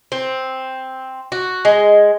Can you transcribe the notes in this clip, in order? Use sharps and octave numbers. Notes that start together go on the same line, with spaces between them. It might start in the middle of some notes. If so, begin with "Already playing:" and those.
C4
F#4
G#3